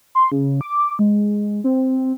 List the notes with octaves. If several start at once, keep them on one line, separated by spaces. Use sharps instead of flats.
C6
C#3
D6
G#3
C4